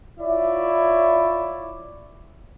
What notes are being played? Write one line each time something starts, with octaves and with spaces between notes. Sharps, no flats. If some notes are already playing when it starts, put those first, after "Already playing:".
E4 F4 C#5 D5 E5